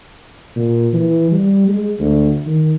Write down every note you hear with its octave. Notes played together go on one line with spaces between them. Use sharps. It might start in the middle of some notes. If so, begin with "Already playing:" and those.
A#2
E3
G3
G#3
D2
D#3